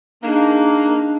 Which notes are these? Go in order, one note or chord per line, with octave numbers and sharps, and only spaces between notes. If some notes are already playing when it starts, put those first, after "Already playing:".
A#3 D4 D#4 G#4